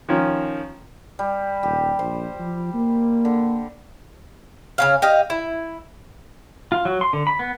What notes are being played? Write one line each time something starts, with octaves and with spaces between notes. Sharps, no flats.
D#3 F3 C#4
G3
D#1 G4
A#1 C5
F3
A#3
D3
C#3 C#4 F5
G4 D#5 F5
E4
F4
F#3
C6
D3
B5
B3